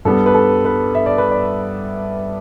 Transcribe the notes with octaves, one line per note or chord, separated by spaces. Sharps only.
G2 G3 B3 A4
B4
A4
B4
E5
D5
B4
D5